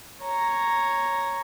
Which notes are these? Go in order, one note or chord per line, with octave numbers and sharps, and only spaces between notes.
C#5 A#5